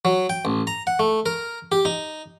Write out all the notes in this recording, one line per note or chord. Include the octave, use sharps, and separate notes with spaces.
F#3
G5
A1
A#5
F#5
A3
A#4
G4
D#4